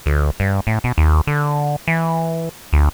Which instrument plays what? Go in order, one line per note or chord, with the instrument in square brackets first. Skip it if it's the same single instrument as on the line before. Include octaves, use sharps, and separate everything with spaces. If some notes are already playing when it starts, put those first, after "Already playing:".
[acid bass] D2
G2
A2
B2
D#2
D3
E3
D2